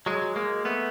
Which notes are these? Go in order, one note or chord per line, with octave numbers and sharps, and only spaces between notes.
F#3 G#3
G#3 A#3
A3 B3